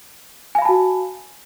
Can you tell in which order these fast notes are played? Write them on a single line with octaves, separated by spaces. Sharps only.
G#5 F5 B5 A5 F#4